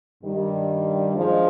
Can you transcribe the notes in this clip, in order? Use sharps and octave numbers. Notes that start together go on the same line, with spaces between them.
G2 D#3 G3
F3 G#3 D4